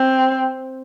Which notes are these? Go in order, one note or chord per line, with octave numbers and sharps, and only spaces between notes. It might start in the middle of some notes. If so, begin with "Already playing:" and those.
Already playing: C4